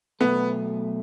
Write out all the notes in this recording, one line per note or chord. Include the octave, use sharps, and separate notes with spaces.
B1 B2 A3 B3